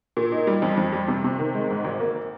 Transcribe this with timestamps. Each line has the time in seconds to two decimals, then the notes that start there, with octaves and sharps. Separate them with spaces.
0.17 A#2
0.32 D#4
0.47 G3
0.62 F2
0.77 F2
0.93 G3
1.08 C3
1.24 C3
1.39 D#3
1.54 G#3
1.70 G#2
1.85 G#1
2.00 A#3